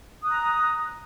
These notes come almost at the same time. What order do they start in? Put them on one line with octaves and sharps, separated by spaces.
D#6 F#6 A#5